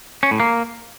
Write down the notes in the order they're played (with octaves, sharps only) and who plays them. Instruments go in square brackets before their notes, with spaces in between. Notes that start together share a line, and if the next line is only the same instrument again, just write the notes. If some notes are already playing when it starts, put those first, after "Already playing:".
[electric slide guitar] C#4
A2
A#3